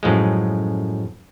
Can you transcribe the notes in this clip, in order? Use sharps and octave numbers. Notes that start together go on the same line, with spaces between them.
F#2 A2 F3 G#3